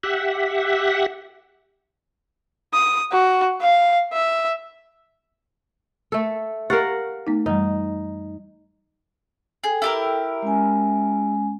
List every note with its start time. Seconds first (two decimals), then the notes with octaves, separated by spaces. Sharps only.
0.03 G4 E5 F#5
2.73 D#6
3.12 F#4
3.62 F5
4.13 E5
6.12 A3 A4
6.70 G4 A#4 F5 F#5 C#6 A6
7.27 A3 B3 D#4
7.46 F#2 E3 G3 D#4
9.64 G#4 A4 G5
9.82 E4 G4 A#4
10.42 G#3 C#4 G#5